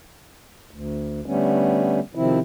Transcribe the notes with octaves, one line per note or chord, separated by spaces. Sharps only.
D2
D3 G3 A3 B3 C#4
C3 D#3 F3 C4 E4